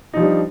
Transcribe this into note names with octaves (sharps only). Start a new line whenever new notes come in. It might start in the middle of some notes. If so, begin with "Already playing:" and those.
F3 G3 D4 D#4